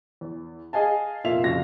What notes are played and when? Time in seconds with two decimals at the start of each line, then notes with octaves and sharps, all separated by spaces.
0.21 E2
0.73 G#4 D#5 F5 G#5 A5
1.24 F1 A#2 A#3 E5 F5 F7
1.44 F#1 F2 F#4 F5 A#6